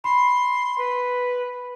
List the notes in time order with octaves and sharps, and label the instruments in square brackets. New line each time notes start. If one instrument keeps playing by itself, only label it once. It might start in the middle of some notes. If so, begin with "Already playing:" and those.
[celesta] B5 [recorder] C6
[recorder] B4